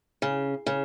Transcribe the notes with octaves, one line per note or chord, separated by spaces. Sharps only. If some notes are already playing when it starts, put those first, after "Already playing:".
C#3
C#3